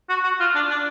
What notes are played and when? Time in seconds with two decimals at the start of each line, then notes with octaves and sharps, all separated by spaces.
0.09 F#4
0.23 F#4
0.40 F4
0.55 D4
0.70 D4